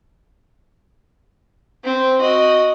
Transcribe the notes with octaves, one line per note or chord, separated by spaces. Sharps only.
C4
F#4 D#5